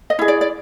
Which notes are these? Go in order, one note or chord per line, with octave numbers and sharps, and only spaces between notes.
D#5
E4 G#4
D5
D5